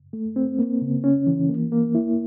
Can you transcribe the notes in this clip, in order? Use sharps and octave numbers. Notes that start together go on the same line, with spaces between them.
A3
C4
A#3
C#3
C#4
E3
A#3
A#3
E4